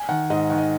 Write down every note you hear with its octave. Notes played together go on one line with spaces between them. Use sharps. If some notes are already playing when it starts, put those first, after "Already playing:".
Already playing: G#5
D#3 F#5
G#2 D#5
D#3 F#5
D#5